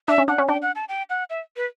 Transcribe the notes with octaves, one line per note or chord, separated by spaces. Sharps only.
D4 E5
C#4
D4 F#5
C#4
D4 G5
F#5
A5
G5
F#5
E5
B4